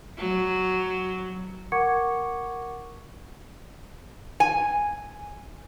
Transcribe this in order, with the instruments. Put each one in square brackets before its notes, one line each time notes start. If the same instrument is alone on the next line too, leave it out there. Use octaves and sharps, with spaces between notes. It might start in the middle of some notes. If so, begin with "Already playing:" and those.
[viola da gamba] F#3
[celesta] A#4 F#5 C#6 D6 G#6 C#7
[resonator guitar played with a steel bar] G#5